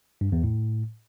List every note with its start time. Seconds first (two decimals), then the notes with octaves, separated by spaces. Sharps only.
0.21 G2
0.32 E2
0.44 A2